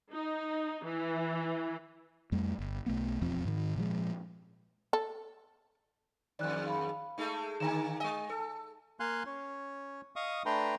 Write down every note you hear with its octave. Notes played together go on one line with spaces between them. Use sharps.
D#4
E3
F2 G3 A3
G1
B1 A3 B3
E1 F2 F3 C4
G#2 D#3
A#2 F3 G#3
A4
F2 G#2 D#3 D5 F#6
F5 B5
G#3 A3 D#4
D3 D#3 A#3 G#5 A#5 E7
G#3 D#5 G#5
A4
A#3 F5 G#5 C6 F#6
C#4 C#5
D#5 F5 C#6 D#6
A3 D4 B4 G5 A#5 C6